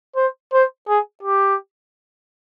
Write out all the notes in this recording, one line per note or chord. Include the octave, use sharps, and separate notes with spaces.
C5
C5
G#4
G4